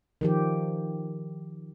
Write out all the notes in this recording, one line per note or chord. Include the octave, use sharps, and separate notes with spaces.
D#3 F3 G4